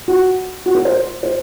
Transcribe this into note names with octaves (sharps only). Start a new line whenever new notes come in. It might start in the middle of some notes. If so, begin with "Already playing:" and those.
F#4
F#4
A#4
C5
C5